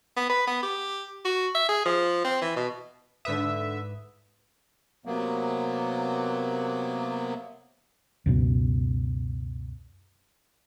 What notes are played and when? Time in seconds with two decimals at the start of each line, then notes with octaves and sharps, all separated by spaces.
0.17 B3
0.29 B4
0.47 B3
0.63 G4
1.25 F#4
1.55 E5
1.69 G#4
1.85 F3
2.24 C4
2.41 E3
2.56 B2
3.25 G#2 D3 B4 E5 D#6
5.05 C3 F#3 A#3 B3
8.26 C#2 F#2 B2